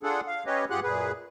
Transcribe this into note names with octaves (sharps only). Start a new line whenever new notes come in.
D4 F4 G#4 A4 F#5
F5
C#4 G4 B4 C#5 D#5
G2 F4 G4 G#4 F#5 F#6
F#2 A#2 G#4 B4